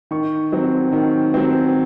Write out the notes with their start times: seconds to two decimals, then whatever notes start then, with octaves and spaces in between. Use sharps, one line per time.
0.11 D#3 C#6
0.52 F#3 C4
0.92 D#3
1.34 F#3 C4